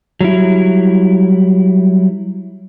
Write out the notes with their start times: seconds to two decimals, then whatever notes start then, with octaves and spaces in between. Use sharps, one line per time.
0.21 F#3 G3 E4